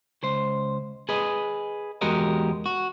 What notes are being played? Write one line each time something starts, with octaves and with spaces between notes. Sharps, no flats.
C#2 C5
G#4 B4 D#5
E2 G#3 F#4 G4 A#4 D#5
F#4